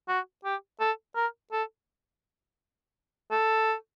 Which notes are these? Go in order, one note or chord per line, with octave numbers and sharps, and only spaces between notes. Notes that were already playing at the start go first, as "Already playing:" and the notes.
F#4
G4
A4
A#4
A4
A4